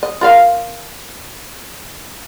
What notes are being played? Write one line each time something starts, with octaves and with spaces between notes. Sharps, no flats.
D#5
F4 A#4 F5